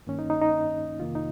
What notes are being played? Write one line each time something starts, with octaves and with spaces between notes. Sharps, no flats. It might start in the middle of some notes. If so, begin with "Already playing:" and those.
G2 D#3 A#3 C#4
D#4
D#4
D#4
F2 C3 D#3 A#3 F4
D#4